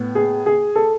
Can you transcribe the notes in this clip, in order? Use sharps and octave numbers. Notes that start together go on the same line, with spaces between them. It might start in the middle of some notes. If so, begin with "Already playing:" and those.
Already playing: A2 B3
G#4
G#4
A4